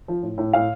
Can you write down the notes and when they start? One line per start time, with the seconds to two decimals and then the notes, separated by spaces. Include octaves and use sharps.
0.08 F3
0.23 A2
0.38 A2
0.53 A2 F5